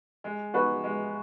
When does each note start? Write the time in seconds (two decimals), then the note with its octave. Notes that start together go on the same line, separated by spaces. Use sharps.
0.24 G#3
0.54 B3 D#4 F#4 B4
0.84 G#3